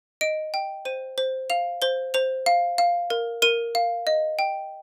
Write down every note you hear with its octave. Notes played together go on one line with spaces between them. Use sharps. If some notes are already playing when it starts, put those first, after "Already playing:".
D#5 D7
G5
C5 D#7
C5
F5 F7
C5 G7
C5 F7
F5
F5
A#4
A#4 D#7
F5
D#5
G5